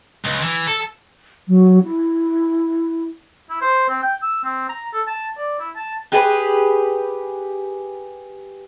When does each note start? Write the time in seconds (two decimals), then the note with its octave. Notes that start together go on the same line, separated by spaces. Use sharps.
0.25 C#2
0.43 E3
0.67 A4
1.48 F#3
1.83 E4
3.50 E4
3.61 C5
3.89 C4
4.02 G5
4.22 E6
4.44 C4
4.69 A#5
4.93 A4
5.07 A5
5.38 D5
5.59 E4
5.76 A5
6.12 G4 G#4 B4